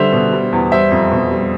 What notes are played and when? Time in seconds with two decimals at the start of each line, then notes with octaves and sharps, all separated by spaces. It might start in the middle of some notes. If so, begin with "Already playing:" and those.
Already playing: D3 G3 C5 E5
0.12 B2
0.33 G3
0.53 E2
0.72 G3 C5 E5
0.92 F2
1.11 B2
1.31 G3